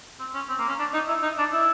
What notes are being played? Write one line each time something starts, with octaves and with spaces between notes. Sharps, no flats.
C4
C#4
C4
A#3
C#4
D4
D#4
E4
D#4
D4
E4